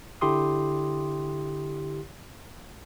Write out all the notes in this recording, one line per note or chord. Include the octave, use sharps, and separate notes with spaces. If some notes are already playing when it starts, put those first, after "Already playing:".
D3 E4 G4 C6 D#6